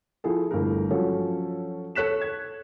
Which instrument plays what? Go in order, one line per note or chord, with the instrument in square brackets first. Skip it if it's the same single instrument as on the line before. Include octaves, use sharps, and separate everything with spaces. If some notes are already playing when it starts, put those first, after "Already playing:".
[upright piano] F3 E4 G#4 A4
G1 A3 E4 A#4
F3 F#3 C#4 A4
A4 C#5 F#6 B6 E7
G#6